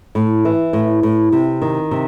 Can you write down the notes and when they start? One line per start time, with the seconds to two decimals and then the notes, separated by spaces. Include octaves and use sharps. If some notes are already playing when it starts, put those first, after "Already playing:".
0.15 A2
0.45 E3
0.73 A2
1.03 A2
1.33 C3
1.62 D#3
1.91 C3